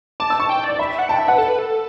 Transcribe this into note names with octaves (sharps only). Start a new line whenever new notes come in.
A5 D6
E6
C#6
G5
D5
E5 B5
F#5
G5 A5
E5
B4 F#5
A4
B4
A4